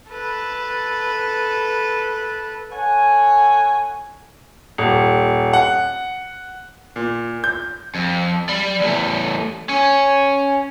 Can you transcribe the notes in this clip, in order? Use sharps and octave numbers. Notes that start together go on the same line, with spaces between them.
A4 B4
A4 C#5 F#5 G#5
D#1
F#5
A#2
G6
F2
D5 B5
E2 A3
C#4